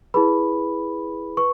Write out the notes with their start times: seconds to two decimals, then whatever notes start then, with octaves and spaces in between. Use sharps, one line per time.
0.14 E4 G#4 B4 B5
1.37 B4 C#6